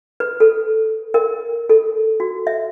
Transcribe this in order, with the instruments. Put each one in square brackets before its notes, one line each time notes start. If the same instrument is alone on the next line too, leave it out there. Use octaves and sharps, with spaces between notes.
[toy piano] B4
A4
A#4
A4
F#4
E5